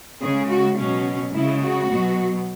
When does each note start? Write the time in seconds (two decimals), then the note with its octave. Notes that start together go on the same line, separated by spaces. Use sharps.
0.20 C#3 G#3 G#4
0.48 F#4
0.77 B2 F#3 C#4
1.34 C#3 G#3 E4
1.62 F#4
1.90 B2 F#3